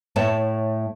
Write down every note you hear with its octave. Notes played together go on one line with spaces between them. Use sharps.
A2 A3 C#5 A5